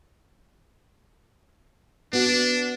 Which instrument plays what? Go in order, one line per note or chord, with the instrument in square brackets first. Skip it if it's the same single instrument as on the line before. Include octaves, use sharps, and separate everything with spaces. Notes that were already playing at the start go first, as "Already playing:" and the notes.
[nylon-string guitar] B3 F#4 [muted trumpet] D4